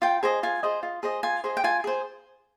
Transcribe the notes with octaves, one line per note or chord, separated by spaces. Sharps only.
F4 G5
G#4 C5 D#5
F4 G#5
G#4 C5 D#5
F4
G#4 C5 D#5
F4 G#5
G#4 C5 D#5
G5
F4 G#5
G#4 C5